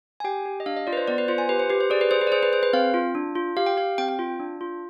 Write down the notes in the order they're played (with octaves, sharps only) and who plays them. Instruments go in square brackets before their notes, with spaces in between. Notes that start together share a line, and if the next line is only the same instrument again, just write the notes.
[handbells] G#5
G4 G5
G4
D#5
D4 F5
D#5
F4 D5
B4
C5
B3 D5
B4
F4 C5
G#5
G4 B4
C5
G4 B4
C5
G#4 D5
B4
G#4 C5
B4
D5
G#4 C5
B4
G#4 C5
B4
C4 F5
F4
D4
F4
G4 F5
G5
G4 F5
C4 G5
G5
F4
D4
F4